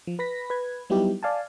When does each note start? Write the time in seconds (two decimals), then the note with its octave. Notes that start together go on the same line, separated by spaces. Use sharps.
0.07 F3
0.19 B4 B5 A#6 B6
0.50 B4 G#6
0.90 F#3 G3 B3 D#4 E4 G4
1.23 D5 F5 G#5 A5